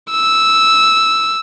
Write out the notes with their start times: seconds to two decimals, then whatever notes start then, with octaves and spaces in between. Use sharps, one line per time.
0.11 E6